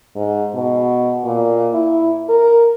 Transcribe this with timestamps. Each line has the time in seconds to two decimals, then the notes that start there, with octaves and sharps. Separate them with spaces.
0.16 G#2
0.55 B2
1.24 A#2
1.74 E4
2.29 A#4